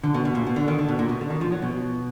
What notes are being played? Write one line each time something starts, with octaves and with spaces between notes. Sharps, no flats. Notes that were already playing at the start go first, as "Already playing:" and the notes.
D3
B2
B2
A#2
B2
D3
D#3
D3
B2
A#2
B2
D3
D#3
F3
F#3
B2